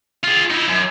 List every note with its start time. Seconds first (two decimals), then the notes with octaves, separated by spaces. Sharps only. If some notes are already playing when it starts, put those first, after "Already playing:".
0.23 F4 G#4
0.50 D#4 E4
0.68 F#2